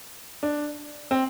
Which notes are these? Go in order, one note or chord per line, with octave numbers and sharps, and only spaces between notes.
D4
C4